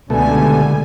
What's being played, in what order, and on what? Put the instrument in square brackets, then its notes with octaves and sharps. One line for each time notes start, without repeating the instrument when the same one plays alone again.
[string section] C#2 G3 G#5 [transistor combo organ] B2 A3 [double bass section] D3